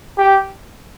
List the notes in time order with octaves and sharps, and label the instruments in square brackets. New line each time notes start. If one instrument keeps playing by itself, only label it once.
[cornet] G4